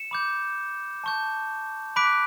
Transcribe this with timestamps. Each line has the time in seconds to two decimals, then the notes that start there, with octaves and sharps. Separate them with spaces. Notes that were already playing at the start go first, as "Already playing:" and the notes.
Already playing: C#7 E7
0.11 B5 D6 G6
1.04 A5 C#6 G6
1.96 B5 D6 F#6 B6 D7